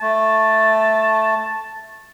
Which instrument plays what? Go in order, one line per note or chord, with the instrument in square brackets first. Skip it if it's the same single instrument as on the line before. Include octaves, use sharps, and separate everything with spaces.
[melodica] A3 [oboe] A5